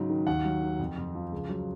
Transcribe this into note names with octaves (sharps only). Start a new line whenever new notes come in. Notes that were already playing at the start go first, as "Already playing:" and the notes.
Already playing: G#2 C#3 F#3
D#3
D#2 F#5
F#3
D#3
F2
F2
F3
C#2
F#3